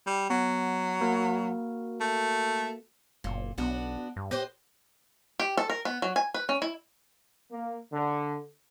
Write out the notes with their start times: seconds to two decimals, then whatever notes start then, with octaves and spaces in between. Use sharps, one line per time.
0.07 G3
0.30 F#3 B3
1.01 A#3 F#4 A#4
2.00 A3
3.24 F#1 A#2
3.58 B1 B3 D4 F#4
4.16 G2
4.31 G4 B4 C5 D#5
5.40 G4
5.57 A4
5.70 A#4
5.85 B3
6.02 F#3
6.16 G#5
6.34 B4
6.49 C#4
6.62 E4
7.51 A#3
7.92 D3